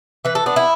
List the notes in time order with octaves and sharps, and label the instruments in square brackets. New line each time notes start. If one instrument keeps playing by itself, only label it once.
[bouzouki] E3 B4
A4
B3 D4
E4